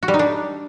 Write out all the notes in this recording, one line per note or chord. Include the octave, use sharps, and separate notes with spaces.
F#4
G3
D#4
D4